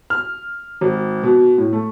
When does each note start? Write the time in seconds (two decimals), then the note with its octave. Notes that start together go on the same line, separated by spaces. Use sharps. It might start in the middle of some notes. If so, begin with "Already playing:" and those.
0.10 F6
0.81 G#1
1.23 B2
1.58 A2
1.73 A3